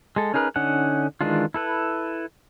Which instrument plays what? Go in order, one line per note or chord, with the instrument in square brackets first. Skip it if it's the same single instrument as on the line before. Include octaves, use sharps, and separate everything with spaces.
[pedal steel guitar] G#3 A4
C#4 D#4 G#4 A#4 B4
D3 C#4 D#4 F#5
D#3 E3 G#3 D4 F4
E4 A4 B4